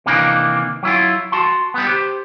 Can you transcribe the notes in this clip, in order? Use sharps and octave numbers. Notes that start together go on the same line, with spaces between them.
C3 D#3 E3 A#3 D4 D#4
F#3 E4 F4
F#4 A5 C6
G3 B3
G4 C5